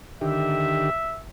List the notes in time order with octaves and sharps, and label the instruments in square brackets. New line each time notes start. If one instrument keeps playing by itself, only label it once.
[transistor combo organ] D3 D#3 G4 [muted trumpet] E5